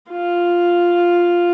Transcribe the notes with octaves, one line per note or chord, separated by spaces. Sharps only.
F4